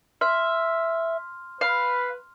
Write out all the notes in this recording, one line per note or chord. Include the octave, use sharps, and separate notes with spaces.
E5 C6 F6
B4 F5